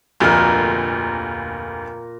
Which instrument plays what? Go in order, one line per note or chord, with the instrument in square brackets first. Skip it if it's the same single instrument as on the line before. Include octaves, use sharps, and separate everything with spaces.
[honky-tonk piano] F1 D2 [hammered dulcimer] A#2 A#4